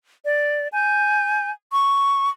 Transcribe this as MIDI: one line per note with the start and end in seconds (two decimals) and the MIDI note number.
0.24 0.68 74
0.73 1.50 80
0.73 1.50 91
1.72 2.29 85